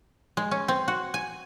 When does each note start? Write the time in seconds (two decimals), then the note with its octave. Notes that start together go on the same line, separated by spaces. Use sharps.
0.37 G#3
0.51 C#4
0.68 C4
0.88 F#4
1.14 G#5